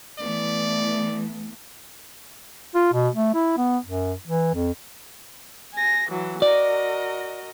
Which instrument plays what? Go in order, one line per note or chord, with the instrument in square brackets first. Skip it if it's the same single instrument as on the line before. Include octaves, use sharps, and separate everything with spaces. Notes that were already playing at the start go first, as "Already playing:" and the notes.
[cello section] E3 A3 B3 [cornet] D5
[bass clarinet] F4
B2
A3
E4
B3
F#2
E3
F2
[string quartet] G#5 A#6
E3 F#3
[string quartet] F#4 A#4 D#5 [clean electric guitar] D5